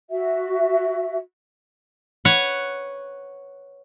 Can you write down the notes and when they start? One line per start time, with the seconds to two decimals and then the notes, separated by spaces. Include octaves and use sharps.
0.11 F#4 E5
2.25 B4 C#5 F#5